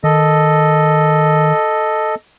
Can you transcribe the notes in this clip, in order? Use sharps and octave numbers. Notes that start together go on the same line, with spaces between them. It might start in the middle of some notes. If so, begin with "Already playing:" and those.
D#3 A4 D#5